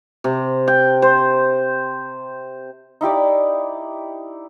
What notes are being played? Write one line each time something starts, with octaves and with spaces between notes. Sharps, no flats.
C3
G5
C5
D#4 E4 G4 D5